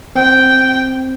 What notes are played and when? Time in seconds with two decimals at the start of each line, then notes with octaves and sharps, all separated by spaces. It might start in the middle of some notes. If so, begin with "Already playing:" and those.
0.15 C4 G5